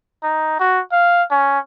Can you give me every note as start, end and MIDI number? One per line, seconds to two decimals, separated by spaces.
0.23 0.57 63
0.60 0.81 66
0.92 1.23 77
1.30 1.59 61